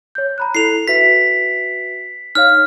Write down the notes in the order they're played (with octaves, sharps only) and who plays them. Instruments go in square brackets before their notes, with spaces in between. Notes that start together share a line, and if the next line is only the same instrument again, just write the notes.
[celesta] C#5 G6
A#5 B5 F#6
[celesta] E4 A4 A#5 [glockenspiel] C7 F7
[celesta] F#4 B4 E5 [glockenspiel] B6
[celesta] D#4 C#5 F5 [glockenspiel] F6